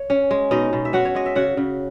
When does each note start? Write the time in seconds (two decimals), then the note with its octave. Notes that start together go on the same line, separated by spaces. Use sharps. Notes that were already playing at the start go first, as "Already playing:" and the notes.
Already playing: C#5
0.10 C#4
0.31 G#3
0.51 B2 D#4 D#5
0.73 B2
0.85 E5
0.93 C#4 F#4 F#5
1.05 C#5
1.15 G#3 D#5
1.26 E5
1.35 C#3 F#4 F#5
1.57 C#3